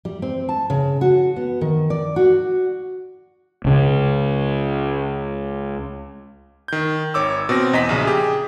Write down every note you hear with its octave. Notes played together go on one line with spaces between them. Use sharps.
G3
C4
A5
C#3
F#4
B3
D#3
D5
F#4
C#2 C#3
D#3 G6
G#1 C#5 D6 E6
B2 C4 A#6
E2 D#5 A#5 B6
A#1 C#3
G4 G#4